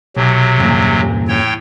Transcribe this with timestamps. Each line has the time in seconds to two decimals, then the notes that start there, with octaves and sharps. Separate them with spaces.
0.16 B1 C3 F#3
0.59 E2 G2 A#2
1.28 A2 C#5 G5